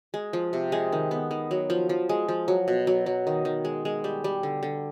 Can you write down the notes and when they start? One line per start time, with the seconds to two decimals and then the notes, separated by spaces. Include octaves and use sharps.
0.14 G#3
0.33 F3
0.53 C3
0.72 G#3
0.92 D#3
1.11 B3
1.31 D#3
1.51 F#3
1.70 F3
1.89 F3
2.09 G#3
2.29 F3
2.48 F#3
2.68 B2
2.87 F#3
3.06 F#3
3.27 D#3
3.45 D#3
3.65 G#3
3.85 G#3
4.04 G3
4.24 G3
4.43 D3
4.63 D3